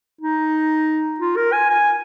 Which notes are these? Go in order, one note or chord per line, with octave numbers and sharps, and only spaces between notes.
D#4
F4
A#4
G#5
G#5